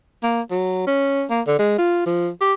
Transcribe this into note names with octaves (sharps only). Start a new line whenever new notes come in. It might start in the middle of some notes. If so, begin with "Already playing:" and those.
A#3
F#3
C#4
A#3
D3
G#3
F4
F3
G4